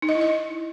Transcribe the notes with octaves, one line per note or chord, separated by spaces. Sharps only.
D#4
D#5
E4
D#5